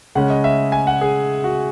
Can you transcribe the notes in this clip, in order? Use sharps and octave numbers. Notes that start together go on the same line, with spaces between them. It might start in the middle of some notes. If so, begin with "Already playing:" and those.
C#3 G#3 C#4 F#5
D#5
E5
G#5
F#5
G#4
F#4